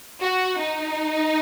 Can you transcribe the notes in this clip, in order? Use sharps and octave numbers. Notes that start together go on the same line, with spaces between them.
F#4
D#4